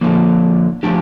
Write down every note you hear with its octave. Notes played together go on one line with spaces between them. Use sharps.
D3 F3 A#3
F3 A3 D4 G4